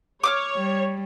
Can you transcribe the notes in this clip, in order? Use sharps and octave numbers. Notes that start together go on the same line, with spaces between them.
C#5 D6 D#6 F6
G3